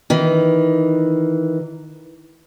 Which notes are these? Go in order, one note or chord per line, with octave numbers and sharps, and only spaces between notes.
D#3 E3